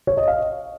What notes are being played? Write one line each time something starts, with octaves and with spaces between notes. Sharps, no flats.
C#5
D#5
F5